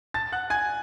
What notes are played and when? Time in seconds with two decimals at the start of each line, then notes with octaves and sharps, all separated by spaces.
0.14 A5 A6
0.32 F#5 F#6
0.50 G#5 G#6